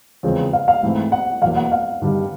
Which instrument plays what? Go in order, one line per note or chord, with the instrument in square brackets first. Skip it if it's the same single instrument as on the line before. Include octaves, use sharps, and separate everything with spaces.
[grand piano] E2 C#3 F3 G#3 C4
[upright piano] F5
F5
[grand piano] G#2 E3 A3 C4 E4
[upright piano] F#5
[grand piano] E2 B2 F#3 A#3 [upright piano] F5
[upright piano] F#5
F5
[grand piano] G2 D#3 G3